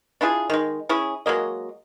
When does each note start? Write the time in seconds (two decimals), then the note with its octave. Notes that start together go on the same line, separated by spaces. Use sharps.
0.21 D4 E4 F4 G#4
0.50 D#3 G#3
0.89 C#4 E4 G#4
1.26 F#3 G#3 A#3 D#5